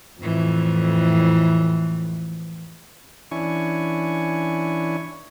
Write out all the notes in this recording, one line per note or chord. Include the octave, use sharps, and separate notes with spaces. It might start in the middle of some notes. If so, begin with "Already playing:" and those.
F2 A2 E3
E3 C#4 D4 E4 G#5 C#6